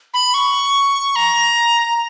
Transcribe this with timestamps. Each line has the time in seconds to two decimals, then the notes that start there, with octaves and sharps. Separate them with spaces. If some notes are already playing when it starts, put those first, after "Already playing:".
0.14 B5
0.34 C#6
1.16 A#5